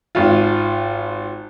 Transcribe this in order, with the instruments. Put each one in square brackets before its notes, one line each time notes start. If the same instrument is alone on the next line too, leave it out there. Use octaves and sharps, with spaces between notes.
[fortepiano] G#1 F4